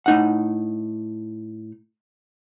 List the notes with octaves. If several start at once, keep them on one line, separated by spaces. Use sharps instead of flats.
A2 D#4 F#5